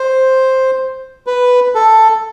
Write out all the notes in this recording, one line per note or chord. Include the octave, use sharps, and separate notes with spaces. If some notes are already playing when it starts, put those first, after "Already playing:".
Already playing: C5
B4
A4